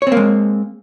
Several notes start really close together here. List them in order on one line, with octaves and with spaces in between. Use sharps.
C#5 C4 A#3 G#3